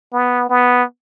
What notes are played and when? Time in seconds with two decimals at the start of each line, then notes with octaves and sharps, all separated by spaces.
0.13 B3
0.50 B3